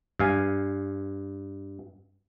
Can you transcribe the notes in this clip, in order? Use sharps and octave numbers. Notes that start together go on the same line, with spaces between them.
G2 F5 G#5